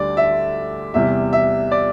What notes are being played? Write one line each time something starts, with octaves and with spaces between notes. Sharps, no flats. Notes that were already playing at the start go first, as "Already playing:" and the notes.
Already playing: D2 D3 G3 D5
E5
E2 C3 G3 E5
E5
D5